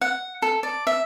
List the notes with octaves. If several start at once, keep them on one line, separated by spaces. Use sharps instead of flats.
F#5
A4
D5
E5